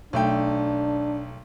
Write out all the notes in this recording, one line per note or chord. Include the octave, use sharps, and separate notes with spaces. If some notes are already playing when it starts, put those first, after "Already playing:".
B1 A3 D4 G5